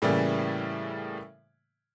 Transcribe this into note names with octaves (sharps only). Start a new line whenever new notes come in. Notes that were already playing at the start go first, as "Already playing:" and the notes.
A2 C#3 E3 G3 A3 A#3